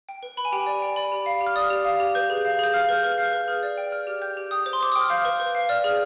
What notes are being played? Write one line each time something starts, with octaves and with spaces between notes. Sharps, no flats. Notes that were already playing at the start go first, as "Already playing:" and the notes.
G5
B4
B4 B5
G#5
G4 G5
G#5
D5
G5
D5 B5
G4
F5
G4
F6
D5 D#6
G4
F5
G4
B4 G6
G#4
F5
G#4 G6
F5 F6
B4 G6
B4 F6
F5 G6
B4 F6
G#4
D5
G5
D5 F6
G4
G5 G6
G4
G5 D#6
C5
C6
C5 D6
G5 D#6
F6
F5 G6
B4
B4
F5
D5 F6
G#4